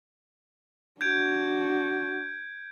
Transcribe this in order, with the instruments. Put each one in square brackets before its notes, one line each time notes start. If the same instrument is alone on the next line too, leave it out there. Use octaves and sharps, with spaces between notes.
[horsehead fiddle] D4 F#4 [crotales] G6 G#6 D7